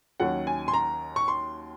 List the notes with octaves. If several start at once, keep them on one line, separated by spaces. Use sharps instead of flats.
D#2 D#3 F#3 C#4 F#5
G#5
C6
A#5
C#6
C6